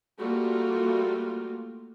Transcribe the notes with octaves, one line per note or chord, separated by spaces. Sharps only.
G3 A3 A#3 F4 F#4